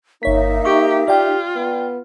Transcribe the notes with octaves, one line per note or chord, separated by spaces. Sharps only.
G1 A#3 D#4 C#5 E5 B6
G4 C#6
F4 G4 D5 G5
B3